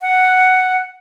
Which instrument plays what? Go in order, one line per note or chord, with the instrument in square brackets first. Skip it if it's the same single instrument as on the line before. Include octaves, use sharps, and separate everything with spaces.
[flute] F#5